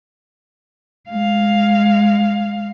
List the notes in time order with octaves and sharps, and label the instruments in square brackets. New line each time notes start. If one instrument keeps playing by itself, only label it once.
[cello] G#3 F5